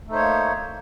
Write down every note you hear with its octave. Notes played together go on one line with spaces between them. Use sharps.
A3 A#3 D#4 C5 C#5